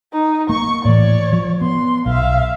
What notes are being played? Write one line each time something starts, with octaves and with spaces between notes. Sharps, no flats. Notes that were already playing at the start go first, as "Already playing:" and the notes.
D#4
A#3 C#6
A2 E3 C#5 D5
F3
B3 C6
B1 E5 F5